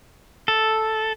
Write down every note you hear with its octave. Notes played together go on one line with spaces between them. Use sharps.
A4